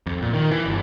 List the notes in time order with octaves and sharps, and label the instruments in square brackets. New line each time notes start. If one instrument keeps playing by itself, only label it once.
[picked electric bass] F2
A#2
D#3
E3
G1